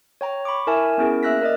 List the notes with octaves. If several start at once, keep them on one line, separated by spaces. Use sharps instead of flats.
C#5 G5 A#5
B5 C#6 D6
E4 A#4 E5 G#5 A5
B3 C#4 E4 G#4 A#4
A#3 E5 E6 F#6 A#6 B6
A#4 D5 D#5